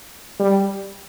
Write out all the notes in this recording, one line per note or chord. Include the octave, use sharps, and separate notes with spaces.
G3